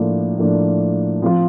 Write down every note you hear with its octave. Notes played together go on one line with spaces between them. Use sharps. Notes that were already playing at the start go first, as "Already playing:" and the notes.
Already playing: A2 F3 A#3 D4
A2 F3 A#3 D4
F3 C4 F4